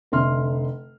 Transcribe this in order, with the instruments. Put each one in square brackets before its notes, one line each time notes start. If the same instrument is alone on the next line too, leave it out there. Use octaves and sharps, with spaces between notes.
[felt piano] F1 D3 E5 C6 F6